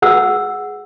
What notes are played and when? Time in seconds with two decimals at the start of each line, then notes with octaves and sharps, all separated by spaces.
0.02 G#4 F#5 E6